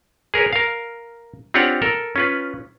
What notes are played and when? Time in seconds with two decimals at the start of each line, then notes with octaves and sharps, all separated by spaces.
0.34 G#4 A#4 B4 C#5
0.53 A#4 F5
1.54 C4 D4 F4 G4 C#5 F#5
1.82 A4 A#4
2.16 C#4 F4 B4